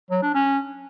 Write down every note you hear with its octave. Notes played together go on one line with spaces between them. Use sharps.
F#3
D4
C#4